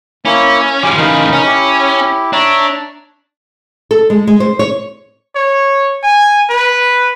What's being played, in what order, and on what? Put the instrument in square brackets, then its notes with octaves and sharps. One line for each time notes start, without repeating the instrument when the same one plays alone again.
[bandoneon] A#3 E4 [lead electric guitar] C#4
[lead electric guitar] F3 G3 [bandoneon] G#5 D6 F6
[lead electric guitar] C#3 E3 [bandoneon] D#4 A#4 B5
[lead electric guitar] C#4
[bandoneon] E4 G4
[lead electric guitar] D4 [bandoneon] C#5 E5 A#5
[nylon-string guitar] A4
G#3
G#3
C5
C#5
[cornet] C#5
G#5
B4